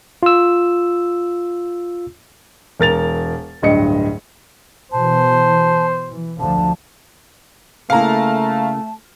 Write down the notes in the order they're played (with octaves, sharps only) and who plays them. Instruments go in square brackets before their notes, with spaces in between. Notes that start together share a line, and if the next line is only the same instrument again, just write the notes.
[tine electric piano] F4 E6
[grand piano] E1 A#4 A6 F7
D1 G2 D#5 C#7
[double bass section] B2 E3 [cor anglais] C5 [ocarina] A5
[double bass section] E3
[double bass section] D2 D3 F3 [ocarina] A5
[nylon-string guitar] C#3 A#3 E4 [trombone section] A3 [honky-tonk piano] F5 A#5 [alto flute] A5